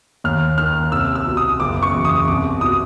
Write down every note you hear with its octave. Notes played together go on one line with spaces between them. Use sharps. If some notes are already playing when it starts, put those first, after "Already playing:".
D#2 F6
D#3 F6
C2 E6
E6
B2
D#6
F#1 D6
C#6
E2 B2
D#6
C2 D6
B2 D#6